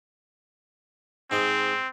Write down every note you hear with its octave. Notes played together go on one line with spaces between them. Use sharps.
G#2 C4 D#5